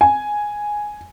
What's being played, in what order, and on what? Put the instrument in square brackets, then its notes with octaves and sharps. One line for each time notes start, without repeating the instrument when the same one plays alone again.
[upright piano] G#5